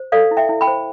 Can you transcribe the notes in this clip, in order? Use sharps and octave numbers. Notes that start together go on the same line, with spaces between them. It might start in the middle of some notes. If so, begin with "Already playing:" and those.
Already playing: C5
A4 D5 F5
E4
E5 G5
E4
G5 B5
C5